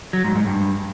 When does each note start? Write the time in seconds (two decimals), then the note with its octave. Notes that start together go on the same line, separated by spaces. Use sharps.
0.13 F#3
0.24 G#2
0.36 G#2
0.47 G2